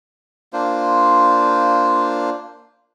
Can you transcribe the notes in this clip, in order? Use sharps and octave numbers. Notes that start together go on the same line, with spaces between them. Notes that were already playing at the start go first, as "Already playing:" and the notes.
A#3 D4 F4 C5